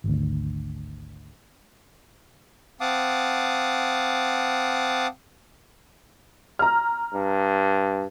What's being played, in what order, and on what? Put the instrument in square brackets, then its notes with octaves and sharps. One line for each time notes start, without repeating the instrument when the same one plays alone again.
[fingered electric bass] G#1 D2
[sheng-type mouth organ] C4 F5 F#5 A5 D6 D#6
[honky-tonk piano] A#5 F6
[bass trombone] G2